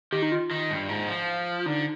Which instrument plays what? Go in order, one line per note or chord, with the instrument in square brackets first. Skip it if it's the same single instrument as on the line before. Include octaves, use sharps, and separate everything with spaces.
[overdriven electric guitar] D#3 [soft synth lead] G4
[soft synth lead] D#4
F4
[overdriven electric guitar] D#3
G2
G#2
F3
[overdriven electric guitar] D3 [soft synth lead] D#4